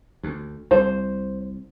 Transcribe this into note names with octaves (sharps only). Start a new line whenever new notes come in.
D2
C2 C5